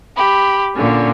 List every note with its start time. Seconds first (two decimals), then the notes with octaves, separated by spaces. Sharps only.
0.17 G4 B5
0.74 A#2 D3 C#4